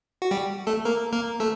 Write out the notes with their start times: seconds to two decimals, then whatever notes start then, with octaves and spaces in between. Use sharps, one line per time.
0.22 F#4
0.31 G3 G4
0.67 A3 A4
0.85 A#3 A#4
1.13 A#3 A#4
1.40 A3 A4